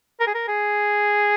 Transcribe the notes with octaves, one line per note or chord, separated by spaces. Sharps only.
A#4
G#4
A#4
G#4